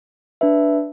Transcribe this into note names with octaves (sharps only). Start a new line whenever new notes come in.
D4 B4 E5